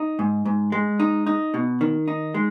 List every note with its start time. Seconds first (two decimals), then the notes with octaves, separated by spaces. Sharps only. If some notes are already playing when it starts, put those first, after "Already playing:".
Already playing: D#4
0.19 G#2
0.45 G#2
0.72 G#3
1.00 D#4
1.27 D#4
1.54 B2
1.81 D#3
2.08 D#4
2.34 G#3